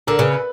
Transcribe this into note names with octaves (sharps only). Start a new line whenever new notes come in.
D3 A#4
C#3 B4